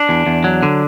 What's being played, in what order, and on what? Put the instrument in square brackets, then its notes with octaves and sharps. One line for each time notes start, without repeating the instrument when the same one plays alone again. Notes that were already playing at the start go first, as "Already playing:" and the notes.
Already playing: [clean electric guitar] D4
E2
E2
F#3
D3